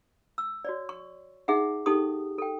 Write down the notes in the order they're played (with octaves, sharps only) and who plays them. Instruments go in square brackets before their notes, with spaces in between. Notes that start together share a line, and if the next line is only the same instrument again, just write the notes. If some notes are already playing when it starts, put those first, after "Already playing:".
[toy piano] E6
F#4 C#5 D5
C#6
D#4 G#4 E5 F#5
D#4 G4 A4 G5 C#6 D#6
A4 G5